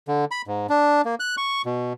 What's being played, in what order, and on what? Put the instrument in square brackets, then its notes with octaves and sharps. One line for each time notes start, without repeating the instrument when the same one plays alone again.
[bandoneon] D3
B5
G#2
D4
A#3
F#6
C#6
B2